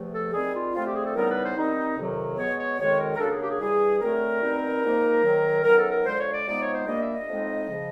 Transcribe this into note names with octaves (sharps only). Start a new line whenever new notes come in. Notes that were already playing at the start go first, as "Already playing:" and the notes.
Already playing: E2 C3 F3 A3
A4
D#3 G3 C4 G#4
F4
D3 F3 A3 C4 F4
G4
G#4
A4
C#3 E3 G3 B3 D#4 A#4
B4
C5
D#3 G3 C4 D#4
F2 C3 D#3 F#3
B2 G#3 B3 C#5
C#5
F2 C3 D#3 G#3 C#5
A#4
A#4
C#3 F#3 A#3 D4 A4
G#4
G4
G#4
G2 E3 G3 G#4
D3 F#3 A3 C4 A#4
B2 G3 C4 D#4
G#2 F3 A#3 D#4
G#2 D#3 F#3
F#2 D#3 F#3 B3 A#4
A4
A#4
D3 F3 G#3 C5
C#5
D5
C3 F3 G#3 B3 D#4 D5
C#5
C5
A#2 G3 A#3 D4 D#5
E5
D#5
A2 F3 G#3 C4 D#4
C#3 F3